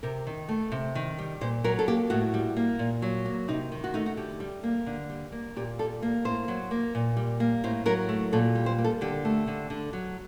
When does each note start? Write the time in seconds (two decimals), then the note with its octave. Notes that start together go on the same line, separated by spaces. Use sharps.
0.03 C3 A#4
0.27 D#3
0.49 A3
0.72 C3
0.95 D#3
1.18 G3
1.41 A#2 C5
1.64 F#3 A#4
1.79 A4
1.88 A#3 G4
2.10 A2 F#4
2.34 G3
2.57 A#3
2.79 A#2
3.02 F#3
3.26 A#3
3.48 C3 D#4
3.72 D#3
3.84 F#4
3.94 A3 D#4
4.06 F#4
4.17 D3 G4
4.40 G3
4.63 A#3
4.86 D3
5.10 G3
5.32 A#3
5.56 A#2 G4
5.79 G3 A4
6.02 A#3
6.25 A2 C5
6.48 F#3
6.71 A#3
6.95 A#2
7.17 G3
7.40 A#3
7.64 A2 C5
7.86 F#3 A#4
8.09 A3
8.32 A#2 A4
8.55 G3
8.66 C5
8.78 A#3
8.84 A4
9.01 D3 G4
9.25 A3
9.47 D3
9.70 D3
9.93 F#3